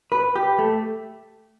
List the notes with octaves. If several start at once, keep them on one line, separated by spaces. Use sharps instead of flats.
B4
G4
A3